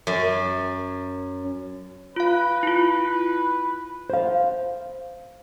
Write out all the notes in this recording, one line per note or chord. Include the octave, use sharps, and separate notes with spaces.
F#2
F4 B4 F5
E4 F4
C5 F5